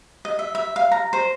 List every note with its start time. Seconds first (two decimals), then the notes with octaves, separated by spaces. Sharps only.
0.25 D#5
0.39 E5
0.55 E5
0.76 F5
0.92 A#5
1.13 C5